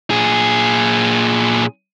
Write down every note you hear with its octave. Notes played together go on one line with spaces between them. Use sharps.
A#2 G#4